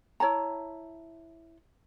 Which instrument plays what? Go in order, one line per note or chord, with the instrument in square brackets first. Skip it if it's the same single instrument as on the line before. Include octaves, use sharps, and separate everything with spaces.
[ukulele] E4 C#5 A5 A#5